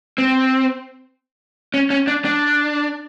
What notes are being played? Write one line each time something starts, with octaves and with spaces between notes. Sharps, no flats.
C4
C#4
C#4
D4
D4